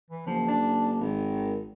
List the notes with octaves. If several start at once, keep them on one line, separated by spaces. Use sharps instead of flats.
E3
F#1 F3
D4
G#1 D#3